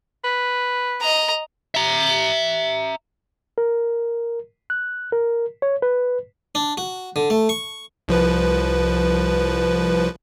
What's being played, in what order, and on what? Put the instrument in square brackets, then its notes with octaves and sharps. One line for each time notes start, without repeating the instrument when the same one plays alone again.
[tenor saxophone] B4
[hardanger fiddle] D#5 A#5
[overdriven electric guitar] E5 A#5
[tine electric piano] A#4
F#6
A#4
C#5
B4
[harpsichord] D4
F#4
D3
A3
C#6
[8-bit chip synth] C2 F3 B4